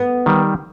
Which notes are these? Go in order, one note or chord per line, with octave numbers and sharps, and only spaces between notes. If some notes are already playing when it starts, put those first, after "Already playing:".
Already playing: B3
D#3 G3